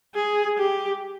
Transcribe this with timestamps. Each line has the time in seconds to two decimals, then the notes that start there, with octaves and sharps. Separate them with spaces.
0.15 G#4
0.57 G4